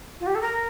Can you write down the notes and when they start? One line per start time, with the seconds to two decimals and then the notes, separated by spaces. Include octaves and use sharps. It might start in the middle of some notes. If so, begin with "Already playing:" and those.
0.20 F4
0.27 G4
0.35 A4
0.41 A#4